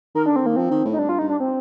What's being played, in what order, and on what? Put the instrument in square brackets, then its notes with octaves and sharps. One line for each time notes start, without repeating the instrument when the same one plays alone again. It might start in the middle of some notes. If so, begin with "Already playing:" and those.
[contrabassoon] D#3 [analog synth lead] A#4
[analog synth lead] D4
[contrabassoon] D3
[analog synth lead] C4
[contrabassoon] D#3 [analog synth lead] A#3
[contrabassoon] F3 [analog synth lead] C4
[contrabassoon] D#3
A2
[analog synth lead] D#4
[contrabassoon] G2 [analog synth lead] D4
[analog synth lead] F4
[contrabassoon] G2 [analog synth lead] D#4
[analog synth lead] D4
C4